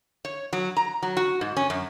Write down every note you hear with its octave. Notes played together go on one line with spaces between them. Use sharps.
C#5
F#3
A#5
F#3
F#4
G#2
C#4
F#2